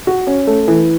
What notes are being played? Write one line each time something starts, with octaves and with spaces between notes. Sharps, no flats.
F#4
C#4
A3
E3